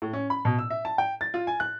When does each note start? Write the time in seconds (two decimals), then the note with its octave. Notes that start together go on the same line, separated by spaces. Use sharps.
0.02 A2
0.13 C#4
0.30 B5
0.45 B2
0.59 E6
0.70 E5
0.85 A5
0.98 G5
1.21 A6
1.34 F4
1.47 G#5
1.60 F#6